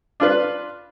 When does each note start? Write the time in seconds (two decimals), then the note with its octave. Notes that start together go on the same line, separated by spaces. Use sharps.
0.20 D4 F4 B4